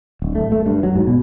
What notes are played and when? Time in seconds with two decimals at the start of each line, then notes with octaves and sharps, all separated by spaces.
0.22 D1
0.35 A3
0.52 A3
0.66 G2
0.83 F#3
0.96 G#2
1.07 B2